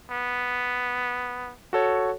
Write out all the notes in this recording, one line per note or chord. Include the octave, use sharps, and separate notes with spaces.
B3
F#4 A4 C#5